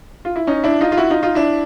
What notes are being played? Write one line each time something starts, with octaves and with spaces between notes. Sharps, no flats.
F4
E4
C#4 D#4
D4 E4
D#4 F4
F4
E4 F#4
D#4 F4
D#4 F4
D4 E4